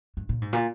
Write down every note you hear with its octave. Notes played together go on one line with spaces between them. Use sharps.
G2
A#2
G#2
A#2